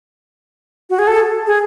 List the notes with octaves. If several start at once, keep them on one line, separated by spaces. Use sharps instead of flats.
F#4
G#4
A4
G#4